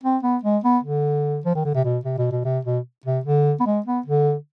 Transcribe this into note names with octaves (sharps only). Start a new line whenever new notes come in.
C4
B3
G#3
B3
D3
F3
D#3
D3
C3
B2
C3
B2
B2
C3
B2
C3
D3
B3
G#3
B3
D3